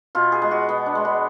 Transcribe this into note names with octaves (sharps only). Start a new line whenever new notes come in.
B2 F4
G#4
G#3
F#4
B2 B3
D4
G#3
B3